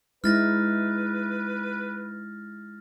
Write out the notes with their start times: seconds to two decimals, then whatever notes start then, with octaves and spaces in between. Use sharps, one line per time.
0.24 G#3 D#4 E4 B4 F6 A6 A#6